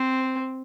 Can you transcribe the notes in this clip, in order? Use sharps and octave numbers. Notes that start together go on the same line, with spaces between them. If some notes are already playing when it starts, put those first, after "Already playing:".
Already playing: C4